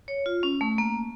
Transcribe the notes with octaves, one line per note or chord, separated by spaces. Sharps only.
C#5
F4
C#4
A3
A#3